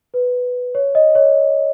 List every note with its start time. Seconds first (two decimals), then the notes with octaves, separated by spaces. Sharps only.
0.14 B4
0.75 C#5
0.95 D#5
1.15 C#5